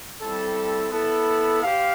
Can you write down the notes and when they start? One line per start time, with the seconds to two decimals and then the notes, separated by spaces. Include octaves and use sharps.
0.20 G3 C4 E4 A4
0.91 B3 E4 A4
1.62 G4 C5 F5